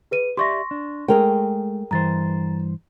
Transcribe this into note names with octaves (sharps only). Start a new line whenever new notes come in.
G#4 B4 D#7
G4 D5 E5 C6 C#6 A#6
D4
G#3 A3 G#4 A#4 G5
G2 E3 C5 A#5 A6